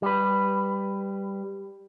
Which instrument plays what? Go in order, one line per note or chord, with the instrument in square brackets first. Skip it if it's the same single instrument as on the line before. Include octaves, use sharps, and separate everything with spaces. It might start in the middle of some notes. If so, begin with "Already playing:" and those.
[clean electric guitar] G3 B4